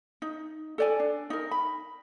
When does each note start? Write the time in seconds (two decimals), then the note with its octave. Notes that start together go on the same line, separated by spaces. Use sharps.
0.22 D#4
0.78 A4 D5 G#5
1.00 D4
1.30 D#4 A#4
1.51 B5